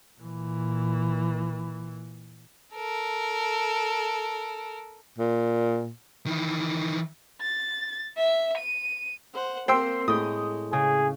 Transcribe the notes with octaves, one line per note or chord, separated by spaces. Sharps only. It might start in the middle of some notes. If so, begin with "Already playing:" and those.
A#2 E3
A4 A#4
A#2
D#3 E3
A6
E5
D#7
C5 F#5
A#3 C4 C5 G5 E6
A2 G#3 G5 D#6
C#3 G#4